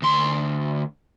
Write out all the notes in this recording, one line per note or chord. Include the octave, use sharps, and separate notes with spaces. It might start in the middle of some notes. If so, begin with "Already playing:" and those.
D2 C6